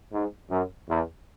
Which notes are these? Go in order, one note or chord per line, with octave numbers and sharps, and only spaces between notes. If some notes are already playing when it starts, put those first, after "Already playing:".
G#2
F#2
E2